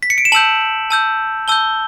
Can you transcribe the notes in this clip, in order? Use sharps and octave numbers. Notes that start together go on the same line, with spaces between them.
B6
C#7
D7
E7
A5 E6 G6 F#7
A5 E6 G6
A5 E6 G6 G7